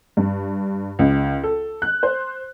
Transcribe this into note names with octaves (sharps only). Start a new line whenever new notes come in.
G2
C#2
A4
F#6
C5